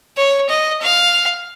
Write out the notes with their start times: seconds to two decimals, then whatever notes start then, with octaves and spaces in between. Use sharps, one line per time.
0.17 C#5
0.49 D#5
0.82 F5